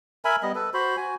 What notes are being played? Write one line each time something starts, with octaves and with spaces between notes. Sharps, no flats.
A#4 E5 G#5 B5
G3 B3 D#5
A4 B4
F#4 C5 B5
F#4 G#5